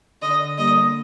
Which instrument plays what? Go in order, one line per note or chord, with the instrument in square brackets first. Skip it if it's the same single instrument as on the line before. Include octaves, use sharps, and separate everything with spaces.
[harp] D3 [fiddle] D#5
[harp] G3 A#3 [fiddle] D#5